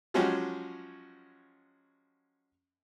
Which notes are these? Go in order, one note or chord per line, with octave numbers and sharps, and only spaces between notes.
F3 F#3 G#3 C#4 F#4 G4